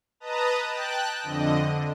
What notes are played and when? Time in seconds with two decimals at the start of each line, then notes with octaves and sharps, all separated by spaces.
0.20 B4 D#5 A5 A#5 D#6
0.67 G5 A5 F#6
1.23 F2 D3 D#5
1.57 D3